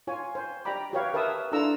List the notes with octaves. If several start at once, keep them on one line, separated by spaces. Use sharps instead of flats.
F4 C#5 G#5
C5
G4 D5 G5 A#5 B5 D6
F#4 G4 B4 C#5 D5 F5
A#4 B4 E5 A5 D#6 E6
D4 E4 F4 A4 A#5 E6